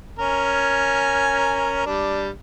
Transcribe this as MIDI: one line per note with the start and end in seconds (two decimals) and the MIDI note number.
0.19 1.82 61
0.19 1.82 70
0.19 1.82 80
1.86 2.30 55
1.86 2.30 62